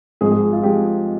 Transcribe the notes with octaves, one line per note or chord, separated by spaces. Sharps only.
G#1 G#2 F3 G#3 G#4
G#4
F4
F3 G#3 G4